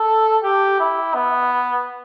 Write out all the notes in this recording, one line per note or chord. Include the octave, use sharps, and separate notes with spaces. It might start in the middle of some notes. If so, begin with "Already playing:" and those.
Already playing: A4
G4
E4
B3